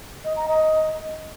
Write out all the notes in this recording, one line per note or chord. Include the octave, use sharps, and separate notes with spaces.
D#5
A#5
D#5